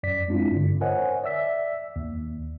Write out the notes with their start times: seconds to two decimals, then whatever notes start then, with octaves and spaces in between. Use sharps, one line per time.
0.03 F#2 D5 B6
0.28 G#3 C4 D4 E4 F4
0.51 G2 D3
0.81 A#4 C5 C#5 D#5 F#5 G#5
1.24 D5 E5 E6 B6
1.96 D#2